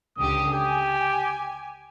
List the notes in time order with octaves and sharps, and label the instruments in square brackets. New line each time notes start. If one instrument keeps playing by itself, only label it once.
[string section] C#2 D3 G4 [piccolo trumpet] D#6
[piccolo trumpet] G4 [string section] G#5